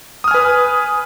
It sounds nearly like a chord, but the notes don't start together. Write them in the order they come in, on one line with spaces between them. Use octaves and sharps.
D#6 F6 G#5 B4